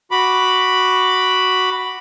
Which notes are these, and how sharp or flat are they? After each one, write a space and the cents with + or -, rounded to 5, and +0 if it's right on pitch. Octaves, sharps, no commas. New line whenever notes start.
F#4 +0 B5 +0 D6 +0